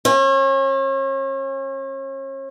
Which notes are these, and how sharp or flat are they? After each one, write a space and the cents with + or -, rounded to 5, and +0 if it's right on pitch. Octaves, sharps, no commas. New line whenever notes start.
C#4 -40